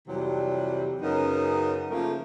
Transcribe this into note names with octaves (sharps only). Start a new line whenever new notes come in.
F2 C3 E3 F#3 G3
F#2 C#3 B3 C#4 D#4 A#4
C#3 F3 A3 A#3 A#4